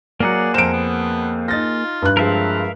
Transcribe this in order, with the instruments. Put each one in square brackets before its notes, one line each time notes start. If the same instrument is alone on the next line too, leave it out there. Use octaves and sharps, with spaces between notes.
[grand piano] F#3 A#4 [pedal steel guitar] A#3 G#4 F#5 [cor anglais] D5
[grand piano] F2 C5 [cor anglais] A#4 [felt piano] D7 E7
[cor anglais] B3
[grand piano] D#4 A6 A#6 [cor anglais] F4
[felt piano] G2 F#6
[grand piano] F3 G#3 [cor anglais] C4 [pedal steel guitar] A#4 E5 F5